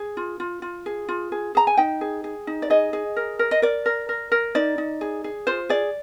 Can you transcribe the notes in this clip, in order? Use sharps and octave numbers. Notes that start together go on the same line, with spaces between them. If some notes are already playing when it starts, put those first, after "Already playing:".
Already playing: G#4
F4
F4
F4
G#4
F4
G#4
G#4 A#5
G#5
D#4 G5
G#4
G#4
D#4
D5
G#4 D#5
G#4
A#4
A#4
D#5
A#4 D5
A#4
A#4
A#4
D#4 D5
D#4
G#4
G#4
F4 C5
G#4 D5